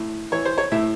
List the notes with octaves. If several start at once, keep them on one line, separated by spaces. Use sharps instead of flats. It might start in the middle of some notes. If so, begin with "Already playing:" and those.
Already playing: A2
E3 C#5
C5
C#5
A2 E5